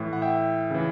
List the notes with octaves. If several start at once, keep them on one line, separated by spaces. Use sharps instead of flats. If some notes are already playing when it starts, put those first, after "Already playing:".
Already playing: A2 E3
F#5
E5 G5
C#3 E3